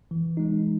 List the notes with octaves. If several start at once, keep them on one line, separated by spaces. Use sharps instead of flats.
E3
G#3 D#4